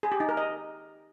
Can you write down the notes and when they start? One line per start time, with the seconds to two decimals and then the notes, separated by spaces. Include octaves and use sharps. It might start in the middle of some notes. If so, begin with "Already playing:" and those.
0.03 G#4
0.12 G4
0.20 D#4
0.29 A#4
0.37 D#5